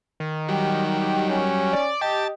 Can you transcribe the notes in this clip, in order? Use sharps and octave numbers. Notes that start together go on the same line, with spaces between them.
D#3
F#3 G3 G4
C#4
D5
G4 D#5 A5